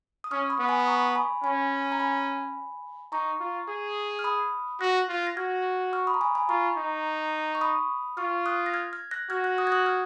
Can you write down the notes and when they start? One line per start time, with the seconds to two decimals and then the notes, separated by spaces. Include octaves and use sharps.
0.24 D#6
0.31 C#4 C#6 F6
0.50 B5 D#6
0.59 B3
0.68 G#5 B5
0.80 D#6
0.87 A#5 C#6
1.15 G#5 B5
1.43 C#4 G#5 B5
1.92 A#5
2.00 G#5 B5
3.12 D#4 A#5 C#6
3.40 F4
3.68 G#4
4.19 F6
4.24 B5 D#6
4.81 F#4 F#6 A#6
5.09 F4
5.27 A#6
5.37 F#4 F6 G#6
5.93 C#6 F6
6.07 B5 D#6
6.14 A#5
6.21 G#5 B5
6.35 G#5 B5
6.49 F4 A#5 C#6
6.77 D#4
7.55 C#6
7.61 B5 D#6
8.17 F4 C#6 F6
8.46 D#6 F#6
8.66 A#6
8.74 F6 G#6
8.93 F6 G#6
9.11 F#6 A#6
9.30 F#4 F6 G#6
9.44 F#6 A#6
9.58 D#6 F#6
9.67 G#6
9.72 D#6 F#6
9.86 F6 G#6